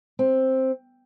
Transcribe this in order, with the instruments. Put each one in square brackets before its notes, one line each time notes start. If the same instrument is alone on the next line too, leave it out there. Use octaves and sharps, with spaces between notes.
[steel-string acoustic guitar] C4